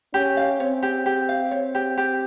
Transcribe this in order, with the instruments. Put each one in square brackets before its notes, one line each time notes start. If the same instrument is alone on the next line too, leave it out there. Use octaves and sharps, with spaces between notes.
[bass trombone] C#4 [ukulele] G4
[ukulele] F5
[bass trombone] C4 [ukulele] C#5
[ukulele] G4
G4
F5
C#5
G4
G4